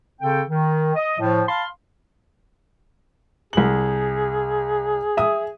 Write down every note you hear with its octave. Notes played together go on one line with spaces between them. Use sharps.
C#3 C4 A4 G5
D#3
D#5
A2 F3
F5 A5 B5 C6
C2 G#4 F#7
E5 D#6